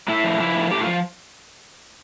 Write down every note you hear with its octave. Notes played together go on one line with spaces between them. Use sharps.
A2 E4
F3
F3 E4
A2
A2 G4
F3 F4